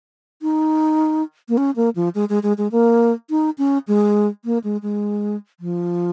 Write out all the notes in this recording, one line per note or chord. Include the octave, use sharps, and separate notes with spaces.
D#4
A#3
C#4
A#3
F3
G#3
G#3
G#3
G#3
A#3
D#4
C#4
G#3
A#3
G#3
G#3
F3